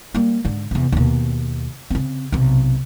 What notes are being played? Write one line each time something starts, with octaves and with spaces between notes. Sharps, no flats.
G3 A#3
G#2 D3
E2 C3
D#2 B2
C#3 C4
B1 C3